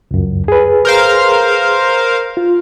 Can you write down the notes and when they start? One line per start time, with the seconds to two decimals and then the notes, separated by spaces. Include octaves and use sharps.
0.11 C#2 F#2
0.48 G#4 B4
0.85 A#4 C5 F5
2.37 F4